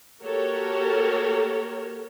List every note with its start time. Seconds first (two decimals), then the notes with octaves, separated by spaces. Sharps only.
0.23 A#3 F#4 G4 A4 A#4 C#5